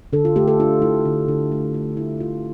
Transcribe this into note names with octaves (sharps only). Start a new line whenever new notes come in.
D3 A4
F4
A3 G4
A4
D4 F4
A3 E4
D3
D3
A3
A3
G3 E4
D3 F4